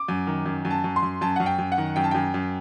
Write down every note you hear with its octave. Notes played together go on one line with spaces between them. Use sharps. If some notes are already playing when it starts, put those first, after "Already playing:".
Already playing: D6
F#2
D#3
F#2
F#2
A5
F#2
C6
F#2
F#2 A5
F#2 F#5
G5
F#2
F#5
D#3
F#2 G5
A5
F#2 G5
F#2